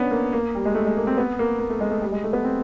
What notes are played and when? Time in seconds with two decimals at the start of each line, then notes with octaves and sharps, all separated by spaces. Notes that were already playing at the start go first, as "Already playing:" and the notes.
Already playing: B3 C#4 D4
0.11 A#3
0.33 A#3
0.55 G3
0.65 G#3
0.75 A3
0.86 G#3
0.97 A#3
1.07 C4
1.18 B3
1.39 A#3
1.59 A#3
1.70 A3
1.80 G#3
1.91 A3
2.02 G3
2.12 G#3
2.24 A3
2.33 B3
2.44 C4